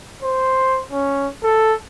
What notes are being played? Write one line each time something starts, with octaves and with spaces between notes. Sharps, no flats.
C5
C#4
A4